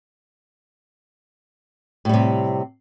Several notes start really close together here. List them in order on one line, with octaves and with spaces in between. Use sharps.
A2 G3 C3